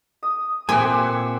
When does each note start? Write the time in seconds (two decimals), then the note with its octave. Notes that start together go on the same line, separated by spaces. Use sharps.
0.23 D#6
0.69 A#2 C4 G4 E5 F#5 G#5 C6